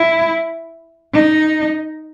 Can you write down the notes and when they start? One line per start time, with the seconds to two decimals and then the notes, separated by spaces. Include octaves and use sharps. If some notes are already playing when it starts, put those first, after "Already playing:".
Already playing: E4
1.14 D#4